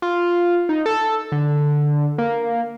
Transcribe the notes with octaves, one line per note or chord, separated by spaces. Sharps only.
F4
D#4
A4
D3
A#3